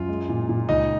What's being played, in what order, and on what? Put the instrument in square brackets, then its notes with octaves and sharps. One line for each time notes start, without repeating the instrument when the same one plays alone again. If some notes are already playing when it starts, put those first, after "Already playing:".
Already playing: [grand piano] F#2 F4
G#3
A#2
A#2
C#2 D#4 D#5